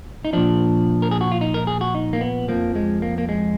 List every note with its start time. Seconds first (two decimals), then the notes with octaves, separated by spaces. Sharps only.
0.25 D#4
0.33 A#2 F3 D4
1.02 A#4
1.11 G#4
1.21 F#4
1.31 F4
1.41 D#4
1.54 A#4
1.67 G#4
1.81 F#4
1.95 D#4
2.13 A#3
2.21 B3
2.48 F2 F3 A#3
2.75 G#3
3.02 A#3
3.18 A#3
3.29 G#3